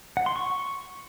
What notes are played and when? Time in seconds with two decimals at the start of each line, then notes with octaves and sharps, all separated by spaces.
0.17 F#5
0.26 C6
0.36 C#6